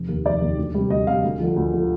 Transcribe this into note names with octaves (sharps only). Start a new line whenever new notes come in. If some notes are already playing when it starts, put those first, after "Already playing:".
Already playing: F1
D#2 D#3
F1 D5
D#2 D#3
D2
C3 G3
D2 D#5
C3 G3 F5
D2
D3 F3
D2
D3 F3